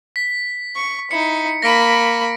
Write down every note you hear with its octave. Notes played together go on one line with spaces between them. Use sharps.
B6
C#6
D#4 E4 C#7
A#3 B5 A#6 B6 D7